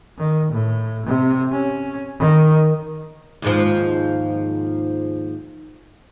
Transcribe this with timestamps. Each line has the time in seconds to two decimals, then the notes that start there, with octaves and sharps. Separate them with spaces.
0.18 D#3
0.52 A2
1.06 C3
1.51 C#4
2.19 D#3
3.42 D#2 G#2 F3